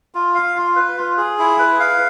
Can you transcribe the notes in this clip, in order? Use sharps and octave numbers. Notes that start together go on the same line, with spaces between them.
F4
F5
F4
B4
F4
G#4
E4
B4
F5